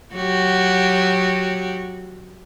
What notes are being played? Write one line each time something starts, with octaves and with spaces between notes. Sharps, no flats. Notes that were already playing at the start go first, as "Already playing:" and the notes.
F#3 F#4 G4